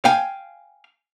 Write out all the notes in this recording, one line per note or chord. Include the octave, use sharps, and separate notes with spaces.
F5 G5 G#5